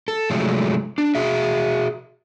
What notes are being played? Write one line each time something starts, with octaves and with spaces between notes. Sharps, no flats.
A4
C3 F3 F#3 G#3 A3
D4
F#4 G#4 E5